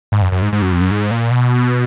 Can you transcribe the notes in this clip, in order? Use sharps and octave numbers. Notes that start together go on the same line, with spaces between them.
G#2
F#2
F#2
G#2
G#2
F#2
F2
F#2
G#2
A#2
B2